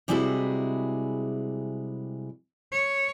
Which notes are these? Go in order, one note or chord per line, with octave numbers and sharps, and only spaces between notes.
C3 G3 G#3 E4 F#4 G#4
C#5